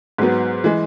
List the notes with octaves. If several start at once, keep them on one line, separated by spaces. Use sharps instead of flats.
G#2 F#3 B3
E3 G#3